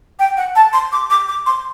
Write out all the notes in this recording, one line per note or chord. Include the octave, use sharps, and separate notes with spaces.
G5
F#5
A5
C6
D6
D6
D6
C6